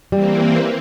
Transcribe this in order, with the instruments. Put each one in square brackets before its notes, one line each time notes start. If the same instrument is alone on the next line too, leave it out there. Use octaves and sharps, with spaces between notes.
[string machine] E3 A#3 C4 [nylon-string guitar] G3